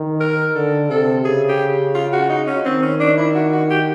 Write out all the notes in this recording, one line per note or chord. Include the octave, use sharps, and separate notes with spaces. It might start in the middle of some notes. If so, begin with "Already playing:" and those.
Already playing: D#3
A#4
D3 A4
C3 A4
C#3 G#4
G4
F4
F#4
D#4
C#4
D#3 C4
C#4
D4
E4
F#4
F#4
G4